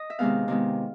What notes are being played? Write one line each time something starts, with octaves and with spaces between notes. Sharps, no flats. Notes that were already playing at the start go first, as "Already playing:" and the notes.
Already playing: D#5
E5
C3 D#3 G#3 B3 F5
C3 D#3 G#3 B3